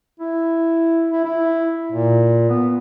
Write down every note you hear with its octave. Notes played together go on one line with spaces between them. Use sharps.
E4
E4
E4
A#2
B3